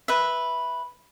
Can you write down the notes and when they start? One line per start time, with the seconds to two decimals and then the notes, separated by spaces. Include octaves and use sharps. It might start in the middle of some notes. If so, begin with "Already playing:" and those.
0.08 B4 E5